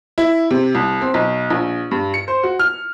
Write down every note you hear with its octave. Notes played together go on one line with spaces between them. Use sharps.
E4
C3
C2
C4
B1
A#1
G2
C#7
C5
F#4
F6